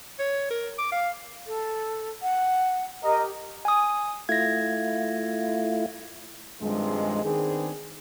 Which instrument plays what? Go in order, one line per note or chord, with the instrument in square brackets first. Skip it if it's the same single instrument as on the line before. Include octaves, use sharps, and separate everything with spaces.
[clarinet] C#5
A#4
D6
F5
[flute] A4
F#5
[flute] G4 [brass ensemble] A#4 D#5
[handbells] G#5 D#6
[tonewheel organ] A3 E4 F4 [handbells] G#6 A#6
[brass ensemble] G2 C3 D#3 F3 G#3
D#3 B3 C4 D4 G#4